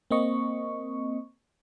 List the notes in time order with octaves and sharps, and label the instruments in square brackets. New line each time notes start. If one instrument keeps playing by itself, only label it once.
[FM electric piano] A#3 C4 D#5 C#6